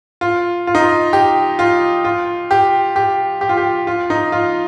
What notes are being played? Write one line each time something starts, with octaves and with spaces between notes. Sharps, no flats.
F4
F4
D#4
F4
G4
F4
F4
G4
G4
G4
F4
G4
F4
D#4
F4